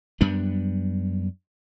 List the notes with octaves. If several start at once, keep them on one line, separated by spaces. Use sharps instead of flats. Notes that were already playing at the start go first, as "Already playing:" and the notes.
F#2 G3 B3 D4